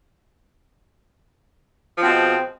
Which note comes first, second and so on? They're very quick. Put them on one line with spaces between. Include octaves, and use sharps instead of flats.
F3 C4 B2 G#3